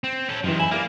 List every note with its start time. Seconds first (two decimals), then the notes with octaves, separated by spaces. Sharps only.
0.04 C4
0.29 C#4 A4
0.44 F#2 C3 D#3 E3
0.60 E4 G#5 B5
0.71 A#3 E4 A#4 D5 F6